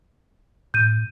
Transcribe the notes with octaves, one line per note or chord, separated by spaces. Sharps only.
A2 G6 D#7